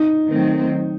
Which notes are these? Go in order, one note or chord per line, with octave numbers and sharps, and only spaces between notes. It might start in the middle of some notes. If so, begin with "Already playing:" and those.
Already playing: D#4
D#3 F#3 A3 C4